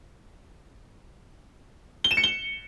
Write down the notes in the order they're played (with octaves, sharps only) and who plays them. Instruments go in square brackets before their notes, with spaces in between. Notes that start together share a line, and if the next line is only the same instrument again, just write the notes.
[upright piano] G7
E7
C#7
G7